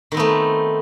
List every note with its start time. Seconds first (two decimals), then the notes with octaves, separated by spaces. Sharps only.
0.12 D#3
0.14 C4
0.17 B3
0.20 A3